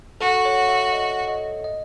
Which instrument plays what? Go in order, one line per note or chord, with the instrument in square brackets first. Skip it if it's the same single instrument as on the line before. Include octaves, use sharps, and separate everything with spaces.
[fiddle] F#4 [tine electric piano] A4
[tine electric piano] C#5
E5
D#5
D#5
D#5